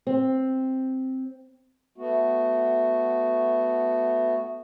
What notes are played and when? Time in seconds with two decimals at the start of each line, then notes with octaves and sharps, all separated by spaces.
0.07 C4
1.98 A3 B3 F#4